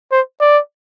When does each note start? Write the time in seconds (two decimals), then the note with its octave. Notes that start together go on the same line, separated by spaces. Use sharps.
0.12 C5
0.41 D5